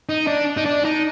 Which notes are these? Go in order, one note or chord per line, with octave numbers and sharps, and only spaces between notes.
D#4
D4
D#4
D4
D#4